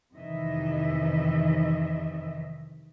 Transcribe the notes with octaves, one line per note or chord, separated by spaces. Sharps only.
F2 C3 D#3 E3 D#5 E5